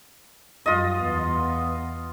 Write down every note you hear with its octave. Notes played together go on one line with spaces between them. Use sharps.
F#2 G3 F4 D#5
E2 B3